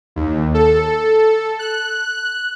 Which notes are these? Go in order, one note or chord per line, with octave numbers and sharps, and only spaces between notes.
D#2
A4
F#6